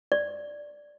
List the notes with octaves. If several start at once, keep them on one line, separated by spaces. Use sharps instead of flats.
D5